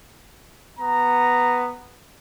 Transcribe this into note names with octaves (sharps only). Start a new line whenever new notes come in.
B3 A#5